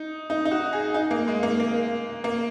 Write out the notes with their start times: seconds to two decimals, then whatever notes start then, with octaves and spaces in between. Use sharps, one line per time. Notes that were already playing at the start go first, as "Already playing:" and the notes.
Already playing: D#4
0.30 D#4
0.45 D#4
0.51 F#4
0.73 G#4
0.94 D#4
1.11 A#3
1.28 G#3
1.43 A#3
1.60 A#3
2.24 A#3